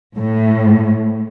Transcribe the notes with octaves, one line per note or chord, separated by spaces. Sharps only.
A2